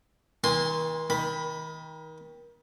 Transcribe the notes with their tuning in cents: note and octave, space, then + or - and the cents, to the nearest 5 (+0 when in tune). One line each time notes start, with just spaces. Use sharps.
D#3 +45 G#5 -25 C6 +0
D#3 +30 B5 +0